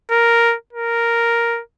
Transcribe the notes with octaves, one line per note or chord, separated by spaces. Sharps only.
A#4
A#4